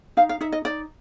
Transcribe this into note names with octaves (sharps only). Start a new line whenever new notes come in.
D#4 F5
F5
D#4 E5
D#5
D#4 D5